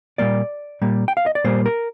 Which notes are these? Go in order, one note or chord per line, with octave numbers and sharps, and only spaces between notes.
A#2 G3 A#3 D5
A#2 G3 A#3
G5
F5
D#5
D5
A#2 G3 A#3 C5
A#4